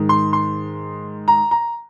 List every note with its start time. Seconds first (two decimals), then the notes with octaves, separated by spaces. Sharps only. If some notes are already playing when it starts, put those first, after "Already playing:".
Already playing: G#2 D#3
0.09 C6
0.33 C6
1.28 A#5
1.51 A#5